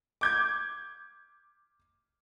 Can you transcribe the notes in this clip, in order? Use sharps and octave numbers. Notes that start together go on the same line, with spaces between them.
D6 G6 G#6